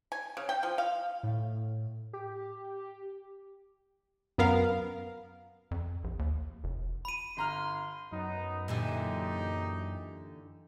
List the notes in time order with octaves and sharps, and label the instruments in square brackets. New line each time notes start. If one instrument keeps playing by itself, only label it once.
[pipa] G#5
C#3
G5
F3
F5
[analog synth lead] A2
G4
[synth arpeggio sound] F#2 B3 A#4 F5
[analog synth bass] F2
A#1
D#2
F1
[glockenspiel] B5 D#7
[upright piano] G1 A#5 F6 [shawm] C6
[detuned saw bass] F#2 [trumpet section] B3 D#4
[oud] A#2 D3 E3 [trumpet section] D#4 G4